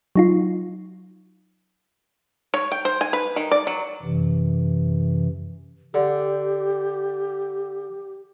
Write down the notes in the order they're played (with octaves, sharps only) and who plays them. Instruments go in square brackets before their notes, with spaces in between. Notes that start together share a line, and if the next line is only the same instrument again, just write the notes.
[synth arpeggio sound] F#3 D#4 F4
[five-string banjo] C#5
G5
C5
G#5
B4
D#3
D5
F#3
[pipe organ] F#2 C3 E3
[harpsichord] D3 [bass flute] G4